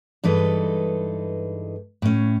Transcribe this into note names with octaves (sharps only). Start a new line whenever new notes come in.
G2 E3 G#3 D#4 A4 B4
A2 C#4